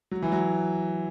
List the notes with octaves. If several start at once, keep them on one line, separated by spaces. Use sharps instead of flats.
F#3
E3
F#3